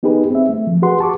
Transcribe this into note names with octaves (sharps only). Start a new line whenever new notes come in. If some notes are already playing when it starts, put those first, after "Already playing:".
B3 D#4 G4 G#4 B4
C4 E5
A3
F3
F#4 G#4 B4 F#5 C6
G4 A5 C#6 D6